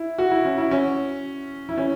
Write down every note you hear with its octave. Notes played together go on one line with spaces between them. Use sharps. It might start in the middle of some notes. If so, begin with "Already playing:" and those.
Already playing: E4
F#4
E4
C#4
E4
C#4
E4
C#4